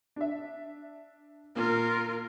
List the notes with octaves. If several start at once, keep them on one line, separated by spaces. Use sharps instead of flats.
D4 E5
A#2 A#3 F4 A#4